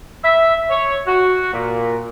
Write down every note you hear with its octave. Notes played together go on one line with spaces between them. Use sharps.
E5
C#5
F#4
A#2